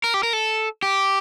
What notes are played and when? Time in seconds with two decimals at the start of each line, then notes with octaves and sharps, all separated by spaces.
0.04 A#4
0.14 G4
0.23 A#4
0.33 A4
0.83 G4